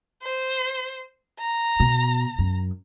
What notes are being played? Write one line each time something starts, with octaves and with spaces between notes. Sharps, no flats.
C5
A#5
B2
F#2